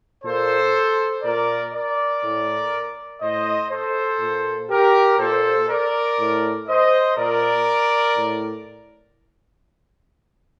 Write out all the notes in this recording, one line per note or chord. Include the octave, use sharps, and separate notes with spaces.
A#2 A4 C5
A#2 A#4 D5
A#4 D5
A2
A2 C5 D#5
A4 C5
A#2
G4 A#4
A#2 A4 C5
A#4 D5
A2
C5 D#5
A#2 A#4 D5
A2